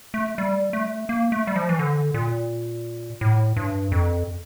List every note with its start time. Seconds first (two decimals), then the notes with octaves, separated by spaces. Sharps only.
0.14 A3
0.38 G3
0.73 A3
1.09 A#3
1.32 A3
1.47 G3
1.56 F3
1.69 E3
1.79 D3
2.14 A#2
3.21 A2
3.56 G2
3.92 F2